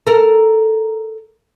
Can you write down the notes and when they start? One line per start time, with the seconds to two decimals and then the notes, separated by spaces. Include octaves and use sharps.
0.07 A4 A#4